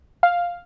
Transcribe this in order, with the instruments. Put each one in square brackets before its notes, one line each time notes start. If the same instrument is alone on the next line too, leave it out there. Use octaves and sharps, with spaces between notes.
[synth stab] F5